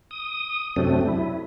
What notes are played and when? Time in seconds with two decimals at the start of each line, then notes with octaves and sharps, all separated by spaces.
0.11 D#6
0.76 F#2 C3 F#3 A3 C4 D4
1.08 E4